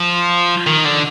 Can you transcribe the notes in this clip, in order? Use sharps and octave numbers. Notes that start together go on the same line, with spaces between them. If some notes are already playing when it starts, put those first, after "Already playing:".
Already playing: F3
D#3
D3